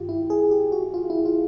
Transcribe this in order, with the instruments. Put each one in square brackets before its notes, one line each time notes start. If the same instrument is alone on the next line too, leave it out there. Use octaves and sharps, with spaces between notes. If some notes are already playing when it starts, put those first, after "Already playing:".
Already playing: [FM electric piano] G2 D#3 F4 G4
E4
G#4
G4
F#4
F4
E4
F4